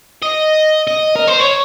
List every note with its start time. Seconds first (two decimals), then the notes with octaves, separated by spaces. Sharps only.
0.23 D#5
0.87 D#5
1.15 A#4
1.27 C5
1.40 C#5